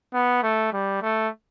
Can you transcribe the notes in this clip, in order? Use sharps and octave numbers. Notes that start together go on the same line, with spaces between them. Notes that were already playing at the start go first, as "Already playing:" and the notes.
B3
A3
G3
A3